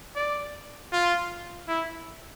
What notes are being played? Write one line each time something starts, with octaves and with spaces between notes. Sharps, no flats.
D5
F4
E4